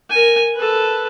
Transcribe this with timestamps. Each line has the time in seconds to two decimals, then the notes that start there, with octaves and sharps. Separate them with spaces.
0.10 A#4 G#5
0.55 A4 B4